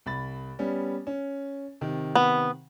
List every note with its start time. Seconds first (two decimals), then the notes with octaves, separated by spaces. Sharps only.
0.06 C2 B5 A6
0.59 G3 B3 C#4
1.07 C#4
1.81 C3 D#3
2.15 B3